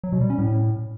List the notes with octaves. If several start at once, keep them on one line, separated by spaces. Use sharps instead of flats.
F#3
B2
G3
C#4
A2